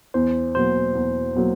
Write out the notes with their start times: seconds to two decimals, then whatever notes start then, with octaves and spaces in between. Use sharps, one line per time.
0.14 E2 C5
0.55 B2 F#3 A#3 C5
0.95 E2
1.35 B2 F#3 A#3